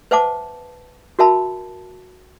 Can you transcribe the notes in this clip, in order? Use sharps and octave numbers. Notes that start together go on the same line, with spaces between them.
B4 C5 E5 F#5 A5 D6
F#4 A#4 E5 A5 B5